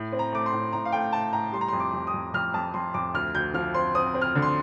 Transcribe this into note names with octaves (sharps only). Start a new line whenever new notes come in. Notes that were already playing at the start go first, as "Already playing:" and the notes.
Already playing: A2
C4
A#5
A3 D6
C6
A2
A2 A#5
F5
A3 G5
A3 A5
A2 A#5
G3 C6
A#5
C6
F2
D6
F2
D#6
F2
F2 F6
F2 A5
F2 C6
F2 D6
D2 F6
D2 G6
F3 F6
C4 C6
C4 D#6
C4
F6
D3
C6